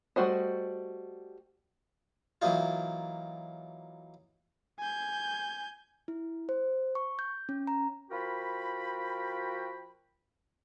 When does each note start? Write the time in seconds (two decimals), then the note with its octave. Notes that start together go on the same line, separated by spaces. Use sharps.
0.16 G3 A3 F#4 C5 D#5
2.42 E3 F#3 A#3 D#4 F4
4.79 G#5 G6
6.08 E4
6.49 C5
6.95 C#6
7.19 G6
7.49 C#4
7.67 A#5
8.11 F3 F4 F#4 A#4 G5 B5